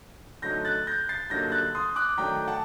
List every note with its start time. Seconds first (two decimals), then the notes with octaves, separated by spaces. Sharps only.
0.42 D3 F#3 A3 D#4 G6 A#6
0.65 F#6 A6
0.87 G6 A#6
1.09 A6 C7
1.30 G2 D3 F#3 A#3 D#4 G6 A#6
1.52 F#6 A6
1.75 C6 D#6
1.96 D6 F#6
2.18 D#3 F#3 A3 D4 G5 A#5
2.47 F#5 A5